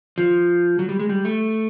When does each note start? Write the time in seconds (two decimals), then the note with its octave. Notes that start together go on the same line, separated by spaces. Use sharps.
0.18 F3
0.79 F#3
0.89 G3
0.99 G#3
1.09 G3
1.25 A3